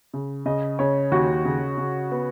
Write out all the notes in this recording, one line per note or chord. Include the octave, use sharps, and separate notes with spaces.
C#3
C#3 D#5
C#3 C#5
D#2 F#4
C#3
C#3
B3